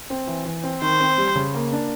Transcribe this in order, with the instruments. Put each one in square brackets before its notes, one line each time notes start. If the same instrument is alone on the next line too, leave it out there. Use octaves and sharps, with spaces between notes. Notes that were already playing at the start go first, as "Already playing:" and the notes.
[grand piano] C4
E3
E3
C4
[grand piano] D#3 [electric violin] C5
[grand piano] C4
G3
C#3
A#3
D4